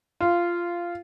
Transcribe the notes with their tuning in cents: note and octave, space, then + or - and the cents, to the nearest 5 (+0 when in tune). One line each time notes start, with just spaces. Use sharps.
F4 -10